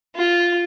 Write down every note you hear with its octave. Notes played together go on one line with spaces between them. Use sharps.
F4